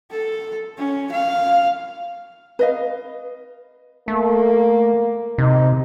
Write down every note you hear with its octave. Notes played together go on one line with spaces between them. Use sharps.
A4
C#4
F5
B4 D#5 F5
A3 A#3
C3 D#4